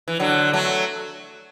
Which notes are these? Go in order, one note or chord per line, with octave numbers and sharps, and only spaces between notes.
E3
D3 F#3
F#3 A3